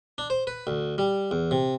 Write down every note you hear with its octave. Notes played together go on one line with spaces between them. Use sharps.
D4
C5
B4
D2
G3
E2
C3